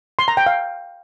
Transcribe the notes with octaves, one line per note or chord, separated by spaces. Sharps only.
C6
A#5
G5
F5